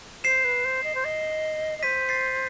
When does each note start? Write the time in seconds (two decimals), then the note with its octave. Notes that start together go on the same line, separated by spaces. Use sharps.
0.24 C5 C7 E7
0.44 B4
0.64 C5
0.83 D#5
0.94 C5
1.04 D#5
1.78 D#5
1.82 C5 B6 D#7
2.09 A6 C7